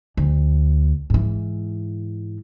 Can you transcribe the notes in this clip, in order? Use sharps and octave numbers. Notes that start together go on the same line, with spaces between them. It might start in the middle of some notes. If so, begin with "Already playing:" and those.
D2
G#2 E3